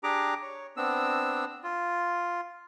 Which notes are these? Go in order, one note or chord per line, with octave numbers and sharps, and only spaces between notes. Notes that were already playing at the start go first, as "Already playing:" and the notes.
D4 G4 G#4 A#5 D6
C#5
B3 C4 D4 E6
F4